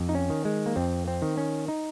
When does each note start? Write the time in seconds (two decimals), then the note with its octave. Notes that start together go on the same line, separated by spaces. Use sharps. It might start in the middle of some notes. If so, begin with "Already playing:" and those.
Already playing: F2
0.09 D#4
0.15 C#4
0.30 D#3
0.45 G#3
0.66 A#3
0.76 F2 C4
1.08 C4
1.22 D#3
1.37 C#4
1.68 D#4